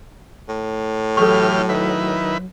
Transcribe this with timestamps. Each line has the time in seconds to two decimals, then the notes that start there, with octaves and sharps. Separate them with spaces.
0.48 A2
1.17 E3 F#3 G4 A4 C#6 F6
1.69 D#3 E4 B4